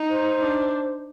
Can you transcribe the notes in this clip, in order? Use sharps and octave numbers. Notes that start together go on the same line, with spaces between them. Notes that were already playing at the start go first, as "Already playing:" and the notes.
Already playing: D#4
C5
D4